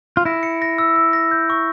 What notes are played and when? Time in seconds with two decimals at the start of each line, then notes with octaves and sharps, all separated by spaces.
0.17 F4
0.25 E4 A#6
0.43 C#7
0.62 A#6
0.78 E6
0.96 E6
1.13 A#6
1.31 G6
1.50 C#6